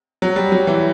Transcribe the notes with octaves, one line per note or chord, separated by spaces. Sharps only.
F#3
G3
F#3
E3